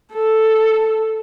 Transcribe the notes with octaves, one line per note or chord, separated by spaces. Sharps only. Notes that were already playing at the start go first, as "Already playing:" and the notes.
A4